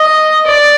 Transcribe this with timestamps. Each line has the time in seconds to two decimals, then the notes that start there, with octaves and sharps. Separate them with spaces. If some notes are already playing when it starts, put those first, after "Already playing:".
Already playing: D#5
0.47 D5